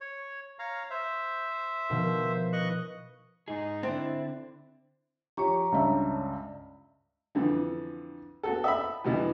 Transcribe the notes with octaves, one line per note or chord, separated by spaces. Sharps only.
C#5
C#5 F5 A#5
C5 E5
B2 D#3 F3
E4 B4 D#5 C#6 F#6
G#2 D#4 G#4
D3 C4 D4 E4
F3 G4 C#5 A#5 C#6
C#2 G2 E5
F2 D3 E3
B3 F#4 A4
E5 B5
E2 G2 B2 D3 E3